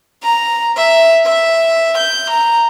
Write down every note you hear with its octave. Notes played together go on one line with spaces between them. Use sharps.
A#5
E5
E5
G6
A#5